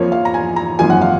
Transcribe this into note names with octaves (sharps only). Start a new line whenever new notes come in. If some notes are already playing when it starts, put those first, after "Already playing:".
Already playing: F2 F3 A#3 C#5
F5
A#5
G#5
A#5
G#1 F#2 F3 A#3 G#5
F#5
F5